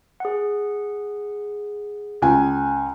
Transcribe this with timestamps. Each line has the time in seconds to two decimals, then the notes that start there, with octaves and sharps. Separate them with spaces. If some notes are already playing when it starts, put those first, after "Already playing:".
0.20 G#4 F#5
2.22 C#2 G#5